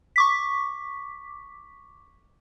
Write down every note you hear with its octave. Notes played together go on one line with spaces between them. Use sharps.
C#6 D6 B6